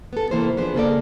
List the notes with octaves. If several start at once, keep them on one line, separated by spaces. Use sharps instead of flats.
B3 A4
C3 E3 A#3 E4 A4 C5
F3 B3 D4 G#4 C5
C#3 A#3 A4 D5